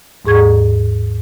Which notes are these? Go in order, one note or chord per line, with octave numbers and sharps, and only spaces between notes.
D#2 G#2 G#4 C#6 G#6